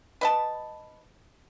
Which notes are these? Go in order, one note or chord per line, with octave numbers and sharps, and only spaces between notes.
B4 D#5 A5